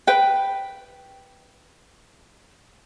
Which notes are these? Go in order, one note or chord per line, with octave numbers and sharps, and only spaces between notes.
B4 G5